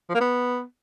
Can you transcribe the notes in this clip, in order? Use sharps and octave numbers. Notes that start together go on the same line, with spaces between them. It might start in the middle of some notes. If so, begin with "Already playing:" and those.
F3
A#3
B3